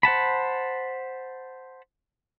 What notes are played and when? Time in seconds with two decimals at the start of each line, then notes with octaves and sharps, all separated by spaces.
0.03 C5 F#5 A5 B5